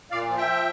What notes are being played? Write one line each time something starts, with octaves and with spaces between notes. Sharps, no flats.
A#2 D5 F5
F3
E5 G5
F3